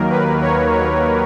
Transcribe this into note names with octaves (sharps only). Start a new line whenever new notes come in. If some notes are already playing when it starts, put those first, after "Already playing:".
Already playing: D#2 D#3 F#3 A#3 A#4
B4
C#5
C#5